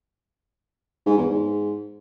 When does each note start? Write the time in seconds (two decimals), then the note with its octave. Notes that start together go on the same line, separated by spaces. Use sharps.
1.06 G#2
1.18 E2
1.30 G#2